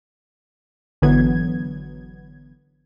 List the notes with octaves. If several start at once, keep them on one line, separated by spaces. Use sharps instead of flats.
G#1 D3 E3 F#3 B3 G#6